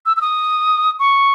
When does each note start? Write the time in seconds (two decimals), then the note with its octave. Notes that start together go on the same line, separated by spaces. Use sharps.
0.06 E6
0.17 E6
0.21 D#6
1.00 C#6